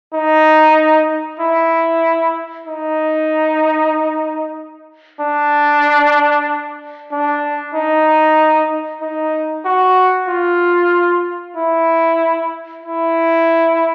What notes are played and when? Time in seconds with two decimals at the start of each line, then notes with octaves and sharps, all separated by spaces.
0.14 D#4
1.40 E4
2.68 D#4
5.21 D4
7.12 D4
7.75 D#4
9.02 D#4
9.65 F#4
10.29 F4
11.57 E4
12.83 E4